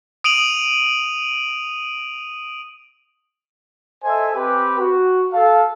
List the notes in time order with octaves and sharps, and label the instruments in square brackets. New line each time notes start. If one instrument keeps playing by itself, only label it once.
[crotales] D#6 D7 D#7 F7 F#7
[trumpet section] A4 C5 D#5 E5 G#5
C4 G4 B4
F#4
A4 F5